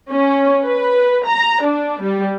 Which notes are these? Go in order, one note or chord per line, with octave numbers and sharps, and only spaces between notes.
C#4
B4
A#5
D4
G3